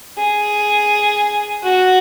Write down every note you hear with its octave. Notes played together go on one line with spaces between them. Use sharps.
G#4
F#4